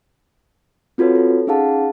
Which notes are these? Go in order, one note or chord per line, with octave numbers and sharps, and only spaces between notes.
C4 F4 F#4 A4 B4 C#5
A4
C#4 D#4 G#4 F5 F#5 A5